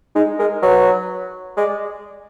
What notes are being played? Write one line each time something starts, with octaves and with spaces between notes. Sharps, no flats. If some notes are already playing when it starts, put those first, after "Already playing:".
G#3 D#4
G#3 A#4
F#3 B4
G#3 D5